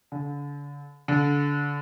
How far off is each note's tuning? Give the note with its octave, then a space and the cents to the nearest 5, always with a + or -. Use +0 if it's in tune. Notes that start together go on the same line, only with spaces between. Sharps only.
D3 -40
D3 -30